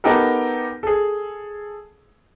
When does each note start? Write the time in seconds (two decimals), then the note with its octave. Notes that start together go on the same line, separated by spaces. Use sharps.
0.04 B3 D#4 G4 A4 A#4
0.83 G#4 A4